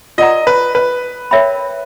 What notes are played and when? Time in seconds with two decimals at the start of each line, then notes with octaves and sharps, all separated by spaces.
0.18 F4 A#4 D5 D#5 F#5 A#5
0.47 B4
0.75 B4
1.31 A#4 C#5 E5 G5 B5